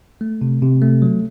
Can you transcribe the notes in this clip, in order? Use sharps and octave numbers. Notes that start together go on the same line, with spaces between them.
A3
C3
C3
A3
F#3